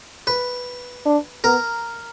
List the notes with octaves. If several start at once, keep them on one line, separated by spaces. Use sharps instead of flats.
B4
D4
B3 A#4